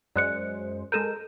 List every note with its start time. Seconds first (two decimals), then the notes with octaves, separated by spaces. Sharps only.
0.16 F#2 G#3 C5 D5 F#6 C#7
0.92 G#3 A4 A#4 G6 D#7 E7